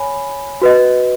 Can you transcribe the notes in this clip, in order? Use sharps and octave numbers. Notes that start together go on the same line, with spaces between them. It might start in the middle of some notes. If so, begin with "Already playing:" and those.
Already playing: C#5 G#5 B5
F#4 B4 D#5